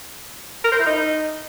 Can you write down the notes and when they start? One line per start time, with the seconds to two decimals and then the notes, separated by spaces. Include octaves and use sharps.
0.64 A#4
0.72 C5
0.79 E4
0.86 D#4